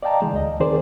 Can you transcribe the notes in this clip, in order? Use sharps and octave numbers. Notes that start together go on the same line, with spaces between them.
D5 D#5 F5 G5 A5 A#5
D3 E3 G#3
D2 D#5
D#3 C4 G#4 A#4 C5 D5